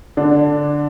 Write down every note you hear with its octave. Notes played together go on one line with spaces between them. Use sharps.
D3 D4